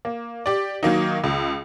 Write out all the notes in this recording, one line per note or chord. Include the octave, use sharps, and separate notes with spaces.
A#3
G4 D5
D#3 F#3 A#3 D#4
C#2